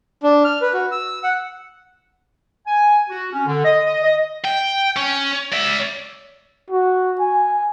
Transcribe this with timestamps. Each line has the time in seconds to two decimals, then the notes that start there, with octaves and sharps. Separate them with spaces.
0.23 D4
0.44 F6
0.61 B4
0.74 F#4
0.92 E6
1.24 F#5
2.66 G#5
3.10 F#4
3.32 C#4
3.46 D3
3.65 D#5
3.84 D#5
4.04 D#5
4.45 G5
4.97 C#4
5.52 D5 E5
6.70 F#4
7.20 G#5